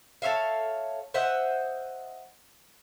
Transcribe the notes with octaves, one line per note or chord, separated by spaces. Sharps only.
A4 C#5 E5 F5
C5 D#5 E5 F#5